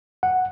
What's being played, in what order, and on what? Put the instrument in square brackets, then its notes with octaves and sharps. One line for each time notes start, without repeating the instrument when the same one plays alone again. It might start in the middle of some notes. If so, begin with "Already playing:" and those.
[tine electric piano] F#5